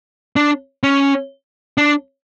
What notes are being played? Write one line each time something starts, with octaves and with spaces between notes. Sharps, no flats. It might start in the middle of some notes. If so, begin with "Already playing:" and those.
D4
C#4
D4